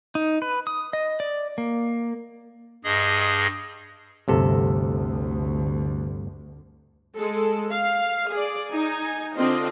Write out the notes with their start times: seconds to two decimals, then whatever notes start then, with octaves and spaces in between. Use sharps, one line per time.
0.15 D#4
0.42 B4
0.67 D#6
0.93 D#5
1.20 D5
1.58 A#3
2.84 G2 G#4 D#5
4.28 G1 D2 C3 A4
7.18 G#3 A4
7.70 F5
8.31 G#4 D5
8.72 D#4 G#5
9.35 D3 C4 D4 F4 D#5